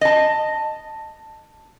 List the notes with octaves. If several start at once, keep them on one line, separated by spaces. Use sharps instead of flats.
D#5 A5